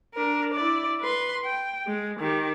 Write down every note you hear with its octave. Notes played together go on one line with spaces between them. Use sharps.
D4 A#4
E4 D5
B4 C6
G5
G#3
D#3 G4